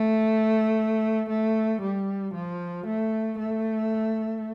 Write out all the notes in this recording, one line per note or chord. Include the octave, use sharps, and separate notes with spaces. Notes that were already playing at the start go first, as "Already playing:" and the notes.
Already playing: A3
A3
G3
F3
A3
A3